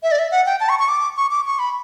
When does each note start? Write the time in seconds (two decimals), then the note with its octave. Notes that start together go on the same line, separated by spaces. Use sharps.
0.03 E5
0.11 D5
0.19 E5
0.31 F#5
0.46 G5
0.60 A5
0.69 C#6
0.79 C#6
0.88 D6
1.16 C#6
1.31 D6
1.46 C#6
1.59 B5